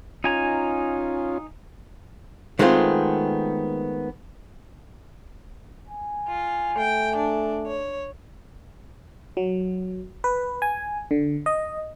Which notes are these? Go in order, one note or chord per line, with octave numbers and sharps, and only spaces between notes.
C#4 D#4 F4 G#5 A#5
D#3 G#3 A3 B3 C4 F4
G#5
F4
A3 G5
D4
C#5
F#3
B4
G#5
D3
D#5